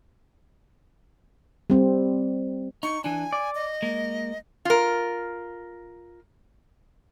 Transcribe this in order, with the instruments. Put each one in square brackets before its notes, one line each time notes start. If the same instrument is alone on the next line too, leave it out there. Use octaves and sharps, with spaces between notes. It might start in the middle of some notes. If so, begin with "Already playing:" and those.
[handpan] G3 C4
[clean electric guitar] D#4 [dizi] C#6
[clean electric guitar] E3 D4 [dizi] G#5
[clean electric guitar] D5
[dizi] D#5
[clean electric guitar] G#3 A#3
[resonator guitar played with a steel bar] F4 A#4